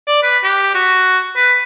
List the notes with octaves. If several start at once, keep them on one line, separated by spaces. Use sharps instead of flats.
D5
B4
G4
F#4
B4